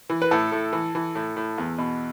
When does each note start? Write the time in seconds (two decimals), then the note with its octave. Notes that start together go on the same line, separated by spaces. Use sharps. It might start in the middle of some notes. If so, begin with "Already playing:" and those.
0.10 E3
0.22 B4
0.31 A2 A4
0.52 A2
0.73 E3
0.95 E3
1.15 A2
1.37 A2
1.58 E2
1.78 B2